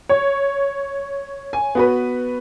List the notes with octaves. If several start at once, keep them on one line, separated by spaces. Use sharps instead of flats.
C#5
G#5
B3 F#4 B4